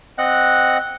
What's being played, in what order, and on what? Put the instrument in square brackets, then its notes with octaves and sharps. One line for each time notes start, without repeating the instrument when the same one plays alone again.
[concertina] C4 D#5 F#5 F#6